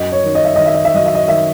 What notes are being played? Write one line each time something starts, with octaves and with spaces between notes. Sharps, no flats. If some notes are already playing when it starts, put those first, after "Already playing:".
Already playing: F#2 D#5
C#5
D#3
D#5
E5
D#3 D#5
E5
D#5
E5
F#3 D#5
E5
D#5
D#3 E5